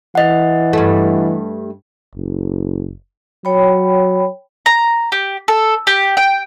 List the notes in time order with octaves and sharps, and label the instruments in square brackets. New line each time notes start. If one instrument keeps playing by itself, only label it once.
[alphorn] E3 [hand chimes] D#5 F#5
[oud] G2 A3
[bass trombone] F#1
[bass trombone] F#3 [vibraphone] C#5 G5 B5
[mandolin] A#5
G4
A4
G4
G5